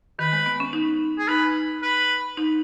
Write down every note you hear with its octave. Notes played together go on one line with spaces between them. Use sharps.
D#3 B4
G#3
B3
C#4
D#4
G#4
D#4 B4
B4
D#4